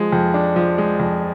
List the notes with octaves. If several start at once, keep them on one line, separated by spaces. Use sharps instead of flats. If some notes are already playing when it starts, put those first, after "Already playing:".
Already playing: F3 G#3
F2
D4
F3
G#3
F2